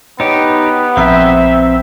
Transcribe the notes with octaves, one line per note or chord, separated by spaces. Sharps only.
B3 D#4 G4 C#5
A#1 F3 C4 E5 A#5